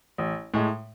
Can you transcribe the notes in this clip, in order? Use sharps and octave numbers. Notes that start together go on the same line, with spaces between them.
A1
A2 G#3